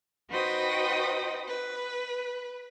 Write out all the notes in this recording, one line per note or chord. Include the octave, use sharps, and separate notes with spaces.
D#4 F#4 B4 C5 G5 D#6
B4